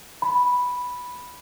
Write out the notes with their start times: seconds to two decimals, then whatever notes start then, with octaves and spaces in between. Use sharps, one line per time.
0.22 B5